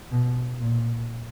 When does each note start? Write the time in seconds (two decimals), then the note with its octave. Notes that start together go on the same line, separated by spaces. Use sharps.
0.11 B2
0.60 A#2